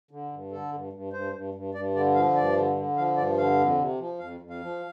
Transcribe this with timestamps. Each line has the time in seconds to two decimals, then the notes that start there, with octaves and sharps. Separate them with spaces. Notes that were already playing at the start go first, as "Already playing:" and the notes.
0.11 D3
0.32 G2
0.52 D3 A4
0.73 G2
0.93 G2
1.13 G2 C5
1.33 G2
1.54 G2
1.74 G2 D5
1.95 D3 D5
2.15 F3 F5
2.36 G2 D5
2.57 D3
2.76 D3
2.97 F3 F5
3.17 G2 D5
3.38 D3 F5
3.58 F2
3.78 C3
3.99 F3
4.19 F2 F5
4.40 F2
4.50 F5
4.61 F3